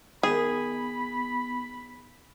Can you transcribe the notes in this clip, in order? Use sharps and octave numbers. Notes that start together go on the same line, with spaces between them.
D#3 B3 D#4 G#4 B5